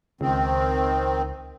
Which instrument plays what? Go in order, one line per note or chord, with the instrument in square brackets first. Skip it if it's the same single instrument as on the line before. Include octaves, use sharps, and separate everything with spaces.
[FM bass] C#2 [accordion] D#3 C4